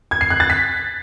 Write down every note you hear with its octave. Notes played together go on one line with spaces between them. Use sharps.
G#6
C7
F#6
A6
B6